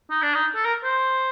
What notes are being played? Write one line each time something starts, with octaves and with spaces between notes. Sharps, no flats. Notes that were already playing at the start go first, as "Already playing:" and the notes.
D#4
D4
D#4
A4
A#4
C5